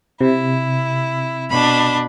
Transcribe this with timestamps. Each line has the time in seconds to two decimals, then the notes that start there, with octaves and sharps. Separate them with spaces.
0.21 C3 E4
1.51 B2 D4 B5